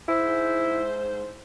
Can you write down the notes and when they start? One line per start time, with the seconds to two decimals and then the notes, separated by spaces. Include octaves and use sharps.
0.08 G#2 E4 C5